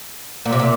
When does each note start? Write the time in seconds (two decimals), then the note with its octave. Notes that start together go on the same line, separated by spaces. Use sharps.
0.45 A#2
0.52 C3
0.60 A#2